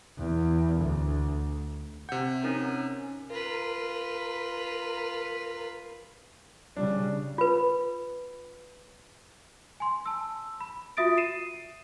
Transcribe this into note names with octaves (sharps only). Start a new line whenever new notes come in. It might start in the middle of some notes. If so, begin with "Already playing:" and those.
E2
D2
C3 F#5 G6
C#4 D#4 A#4
F4 A#4 B4
C#3 G3 D4
F4 B4
G#5 C6
A5 E6
B5
F4 F#4 E5 D#6 A6 D7
C7 D#7 E7